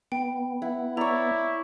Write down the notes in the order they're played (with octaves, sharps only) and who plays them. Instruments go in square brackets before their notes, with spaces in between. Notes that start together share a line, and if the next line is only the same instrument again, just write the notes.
[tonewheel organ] B3 [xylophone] G5
[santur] E4 F#5
[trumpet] E4 [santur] C#5 D5 [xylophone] A#5